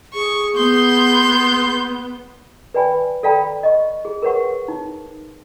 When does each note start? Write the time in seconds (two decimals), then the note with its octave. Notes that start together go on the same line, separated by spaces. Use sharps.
0.14 G#4 C#6
0.57 B3 C6 G6
2.74 B4 D5 G5 G#5 B5
3.23 A4 D5 F5 G5 A5 B5
3.63 D#5 C#6
4.05 G#4
4.22 A#4 B4 C#5 F#5 C#6
4.68 D#4